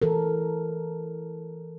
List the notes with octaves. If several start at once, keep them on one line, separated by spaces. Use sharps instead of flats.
E3 A4 A#4